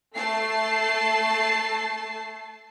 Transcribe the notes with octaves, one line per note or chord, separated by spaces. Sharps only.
A3 A5 C7